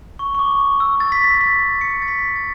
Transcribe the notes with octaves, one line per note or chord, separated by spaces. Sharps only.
C#6
C#6
D6
C#6
E6
A6
B6
A6
A6
B6
C#7
A6
B6
A6